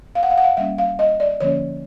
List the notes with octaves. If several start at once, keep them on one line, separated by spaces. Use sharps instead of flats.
F5
F#5
F5
F#5
F5
G3 A#3 C#4 E5
F5
D#5
D5
D3 F3 A#3 C#4 C#5